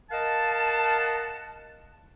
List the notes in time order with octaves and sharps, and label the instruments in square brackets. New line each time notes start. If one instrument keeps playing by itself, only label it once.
[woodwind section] A#4 D#5 F5 F#5 A5